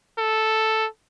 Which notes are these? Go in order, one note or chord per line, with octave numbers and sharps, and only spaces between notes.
A4